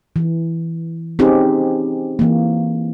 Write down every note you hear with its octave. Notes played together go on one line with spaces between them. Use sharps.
E3
C4 C#4 D#4 G4 G#4
E3 A#3